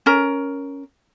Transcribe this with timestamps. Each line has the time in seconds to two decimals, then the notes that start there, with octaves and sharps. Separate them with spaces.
0.06 C#4 A#4